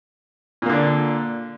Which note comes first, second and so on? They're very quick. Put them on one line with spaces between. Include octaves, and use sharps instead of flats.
A#2 A#3 D3 D4